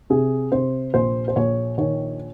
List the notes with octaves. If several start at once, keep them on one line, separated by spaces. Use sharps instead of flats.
C3 G#4
C3 C5
A#1 C5
C5
A#1 C#5
D#3 C#5